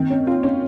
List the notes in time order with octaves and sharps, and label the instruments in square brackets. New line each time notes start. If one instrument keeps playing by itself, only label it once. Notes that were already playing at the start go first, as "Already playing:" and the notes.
Already playing: [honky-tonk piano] D#3 [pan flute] C4
[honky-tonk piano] C#4
F4
C#4